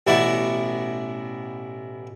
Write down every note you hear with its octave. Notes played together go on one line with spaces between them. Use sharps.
A1 B2 E4 D5 F#5 C#6